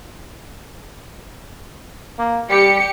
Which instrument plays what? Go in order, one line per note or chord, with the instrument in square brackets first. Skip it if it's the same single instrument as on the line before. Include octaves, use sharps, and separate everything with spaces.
[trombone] A#3
[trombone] G3 [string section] G4 C#7